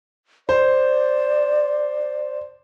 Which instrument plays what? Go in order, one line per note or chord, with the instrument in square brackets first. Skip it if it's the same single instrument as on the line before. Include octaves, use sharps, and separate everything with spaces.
[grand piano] C5 [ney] D5